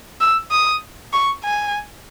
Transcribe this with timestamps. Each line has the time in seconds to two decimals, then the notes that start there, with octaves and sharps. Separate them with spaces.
0.21 E6
0.51 D#6
1.13 C#6
1.44 G#5